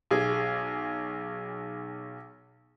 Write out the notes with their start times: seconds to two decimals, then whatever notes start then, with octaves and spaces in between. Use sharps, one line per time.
0.11 B1 G#4